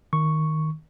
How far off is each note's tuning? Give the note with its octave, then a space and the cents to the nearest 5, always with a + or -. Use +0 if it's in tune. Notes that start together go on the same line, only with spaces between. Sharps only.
D#3 +0 C#6 +0